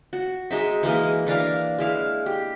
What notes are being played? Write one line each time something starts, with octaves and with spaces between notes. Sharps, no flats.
F#4
G#3 D#4 E5
E3 G#3 A#3 D#5
E3 D4 A#4 F5
G#3 E4 F5
G4